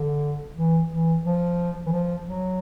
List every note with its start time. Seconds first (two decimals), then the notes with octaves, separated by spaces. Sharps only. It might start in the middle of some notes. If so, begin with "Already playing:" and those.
Already playing: D3
0.56 E3
0.91 E3
1.24 F3
1.86 E3
1.92 F3
2.26 F#3